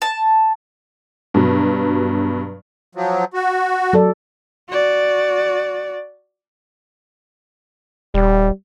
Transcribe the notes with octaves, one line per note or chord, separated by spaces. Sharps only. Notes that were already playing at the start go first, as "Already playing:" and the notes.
A5
G2 B2 F#3
F3 F#3
F#4
F#3 A4 D5
F#4 D5
D#1 G3